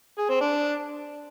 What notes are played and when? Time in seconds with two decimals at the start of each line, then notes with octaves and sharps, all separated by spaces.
0.18 G#4
0.29 C4
0.41 D4